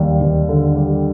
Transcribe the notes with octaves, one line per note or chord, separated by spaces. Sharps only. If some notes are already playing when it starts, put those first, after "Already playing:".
Already playing: D#2 G3
D#2
D3
G3